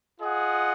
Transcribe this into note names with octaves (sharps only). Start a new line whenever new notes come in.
F4 G#4 D#5 F#5